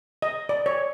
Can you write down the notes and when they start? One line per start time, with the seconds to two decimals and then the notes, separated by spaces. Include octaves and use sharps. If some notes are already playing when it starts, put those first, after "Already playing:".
0.22 D#5
0.49 D5
0.66 C#5